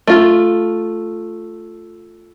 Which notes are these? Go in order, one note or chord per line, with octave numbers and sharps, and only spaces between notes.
A3 F4